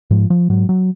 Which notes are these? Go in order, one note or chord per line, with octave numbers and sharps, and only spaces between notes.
G#2 F3
F3
G#2 F#3
F#3